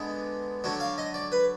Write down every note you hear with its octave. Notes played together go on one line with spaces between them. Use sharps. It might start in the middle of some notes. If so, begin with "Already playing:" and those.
Already playing: D3 G#3 B3 D4
D3 F#3 D4
F5
D#5
D5
B4